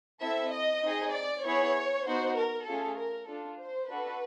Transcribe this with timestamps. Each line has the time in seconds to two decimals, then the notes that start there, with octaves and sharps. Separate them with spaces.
0.22 C4 E4 A4 E5
0.53 D#5
0.83 C4 D#4 G#4
1.14 D5
1.45 B3 E4 G#4 C#5
2.06 B3 D#4 F#4 C5
2.37 A#4
2.66 A3 C#4 F4 G#4 A4
2.98 A#4
3.28 D4 F4 A4
3.59 C5
3.90 D4 F#4 A4 B4